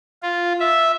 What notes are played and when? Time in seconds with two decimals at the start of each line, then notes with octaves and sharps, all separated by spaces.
0.23 F4
0.60 E5